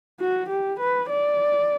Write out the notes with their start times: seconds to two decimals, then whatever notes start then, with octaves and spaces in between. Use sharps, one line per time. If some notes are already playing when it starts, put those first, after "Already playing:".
0.20 F#4
0.49 G4
0.80 B4
1.09 D5